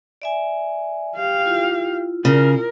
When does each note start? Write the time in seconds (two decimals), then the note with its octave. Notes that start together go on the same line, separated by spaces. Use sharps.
0.22 D5 E5 G#5
1.16 G4 F5
1.45 E4 F4
2.25 C#3 A#4